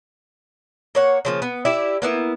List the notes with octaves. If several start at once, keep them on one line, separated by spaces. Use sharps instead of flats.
A#3 C#5 F#5
C#3 F3 A#3
B3
E4 G4 D5 E5
A#3 B3 E4